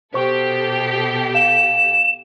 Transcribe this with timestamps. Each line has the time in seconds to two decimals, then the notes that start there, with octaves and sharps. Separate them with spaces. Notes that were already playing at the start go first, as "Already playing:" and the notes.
0.14 B2 G4 A4 C5 C#6
1.35 F5 E7